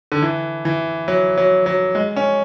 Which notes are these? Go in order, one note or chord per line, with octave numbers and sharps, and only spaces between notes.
D3
E3
E3
F#3
F#3
F#3
G#3
C#4